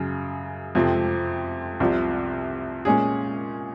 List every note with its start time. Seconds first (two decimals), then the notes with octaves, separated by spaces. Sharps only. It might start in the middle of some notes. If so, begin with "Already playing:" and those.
Already playing: F#2 C#3 F#3
0.75 F2 C3 F3 C4
1.80 C2 C3 F3
2.85 A#2 G#3 C#4 G#4